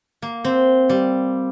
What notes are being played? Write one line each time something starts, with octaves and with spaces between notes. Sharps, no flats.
A#3
C4
G3